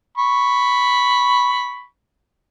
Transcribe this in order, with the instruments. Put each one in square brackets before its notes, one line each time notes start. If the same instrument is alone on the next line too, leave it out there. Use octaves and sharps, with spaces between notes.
[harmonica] B5 C#6